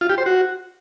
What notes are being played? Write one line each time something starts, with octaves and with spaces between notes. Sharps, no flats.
F4
G4
C5
F#4